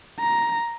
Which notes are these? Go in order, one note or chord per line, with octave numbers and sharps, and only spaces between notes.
A#5